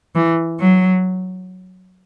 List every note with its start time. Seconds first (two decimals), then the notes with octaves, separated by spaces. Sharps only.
0.15 E3
0.60 F#3